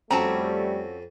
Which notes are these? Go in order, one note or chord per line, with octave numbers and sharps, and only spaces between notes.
F2 G3 A3 C4 C#4 F#4 A5 A#5